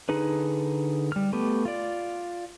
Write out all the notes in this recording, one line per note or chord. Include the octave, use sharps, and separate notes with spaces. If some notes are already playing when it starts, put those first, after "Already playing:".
D3 D#4 G#4 B4
G3 F6
A3 B3 G4
F4 D5